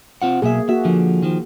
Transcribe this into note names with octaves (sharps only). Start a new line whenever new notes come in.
C4 F4 F#5
B1 B2 A#3 G#4 E5
A#3 F#4 E5
D3 F3
D#3 F3